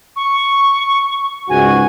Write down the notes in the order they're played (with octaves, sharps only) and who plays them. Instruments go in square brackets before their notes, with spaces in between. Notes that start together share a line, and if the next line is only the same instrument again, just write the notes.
[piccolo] C#6
[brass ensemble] C#2 G#2 F#4 [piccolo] G#5